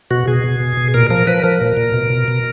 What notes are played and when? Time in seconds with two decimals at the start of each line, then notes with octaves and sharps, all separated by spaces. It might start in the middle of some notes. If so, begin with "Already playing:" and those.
0.11 B2 F#4
0.28 B2 G#4
0.44 B2
0.60 B2
0.77 B2
0.94 A#2 A#4
1.10 F3 A#4
1.27 F3 B4
1.44 F3 A#4
1.61 A#2
1.77 A#2
1.94 B2
2.10 B2
2.28 B2